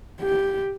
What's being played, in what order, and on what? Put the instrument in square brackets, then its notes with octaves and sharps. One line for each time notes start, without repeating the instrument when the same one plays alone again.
[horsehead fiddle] G4